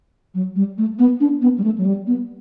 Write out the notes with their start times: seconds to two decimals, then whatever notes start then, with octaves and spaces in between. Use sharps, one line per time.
0.35 F#3
0.56 G3
0.78 A3
0.99 B3
1.20 D4
1.42 B3
1.58 G3
1.64 A3
1.78 F#3
1.85 G3
2.07 B3